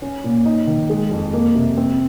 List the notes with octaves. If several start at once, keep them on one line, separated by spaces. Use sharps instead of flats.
C#4
A#2
D#4
D#3
G#3
F2
A#3
C3
C4